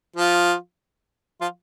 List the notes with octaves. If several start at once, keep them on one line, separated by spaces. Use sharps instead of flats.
F3 F4
F3 F4